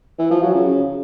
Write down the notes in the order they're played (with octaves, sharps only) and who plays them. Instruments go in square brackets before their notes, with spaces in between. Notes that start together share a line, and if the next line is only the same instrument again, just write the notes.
[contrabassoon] E3
F3
F#3
C#3